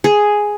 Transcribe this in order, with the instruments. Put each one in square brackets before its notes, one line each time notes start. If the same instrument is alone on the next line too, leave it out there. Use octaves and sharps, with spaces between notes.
[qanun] G#4